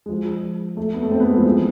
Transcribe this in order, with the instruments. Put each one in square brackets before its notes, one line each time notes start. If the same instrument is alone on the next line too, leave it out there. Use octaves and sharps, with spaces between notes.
[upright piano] G#3
F3
A3
B3
A3
C4
A3
B3
G#3
F3
E3